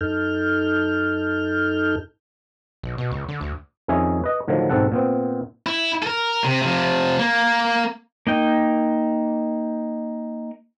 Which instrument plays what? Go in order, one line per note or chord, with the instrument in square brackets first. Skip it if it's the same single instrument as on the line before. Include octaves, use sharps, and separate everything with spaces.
[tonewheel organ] F#2 D#4 A4 F6 G6
[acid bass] B1
B2
C#2
D3
D2
[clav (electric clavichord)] F2 D#3 C#4 G#4 E5 G#5
B4 D#5
A2 D3 D#3 F3 F#3
B1 G#2 C4 A4 F#5
A#2 B3 C4
[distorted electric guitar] E4
A4 A#4
C3
C3 F3
A#3
[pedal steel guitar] A#3 D#4 G5